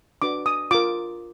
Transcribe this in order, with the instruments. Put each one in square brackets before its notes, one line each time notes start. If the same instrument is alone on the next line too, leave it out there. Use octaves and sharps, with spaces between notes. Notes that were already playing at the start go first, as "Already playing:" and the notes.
[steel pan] D4 F#4 B4 D6
D#6
F4 A#4 D6